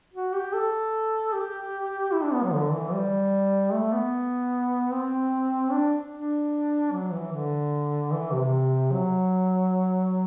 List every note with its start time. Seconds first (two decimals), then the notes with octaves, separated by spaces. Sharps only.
0.14 F#4
0.33 G4
0.53 A4
1.33 G4
2.13 E4
2.23 D4
2.33 B3
2.44 F#3
2.53 D3
2.73 E3
2.93 G3
3.73 A3
3.93 B3
4.92 C4
5.72 D4
6.13 D4
6.92 F#3
7.12 E3
7.32 D3
8.12 E3
8.32 C3
8.92 F#3